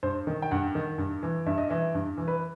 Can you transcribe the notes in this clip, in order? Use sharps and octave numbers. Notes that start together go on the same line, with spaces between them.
G2 C5
D#3
G5
G2 F#5
D#3
G2
E3
G2 E5
D#5
E3 E5
G2
E3
B4